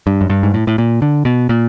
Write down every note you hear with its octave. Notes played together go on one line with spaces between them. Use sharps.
G2
F#2
G2
G#2
A2
A2
A#2
D3
B2
A#2